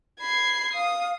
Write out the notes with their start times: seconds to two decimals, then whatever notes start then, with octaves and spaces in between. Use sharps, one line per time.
0.21 B5 G#6 C7
0.74 F5 D#6